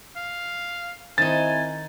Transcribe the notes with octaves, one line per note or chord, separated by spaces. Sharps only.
F5
D#3 C4 D#4 E4 C5 G#5 A6